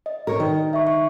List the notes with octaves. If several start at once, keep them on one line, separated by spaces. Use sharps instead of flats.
D#5
A#4 C#5 A#5
D#3
E5 C#6
C#6